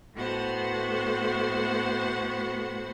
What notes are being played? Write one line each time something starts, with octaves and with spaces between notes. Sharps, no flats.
A2 A3 B3 F#4 C5 F#5